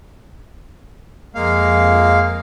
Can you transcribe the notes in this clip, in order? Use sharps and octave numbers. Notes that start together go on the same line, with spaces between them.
F2 G#3 A#3 F5 C7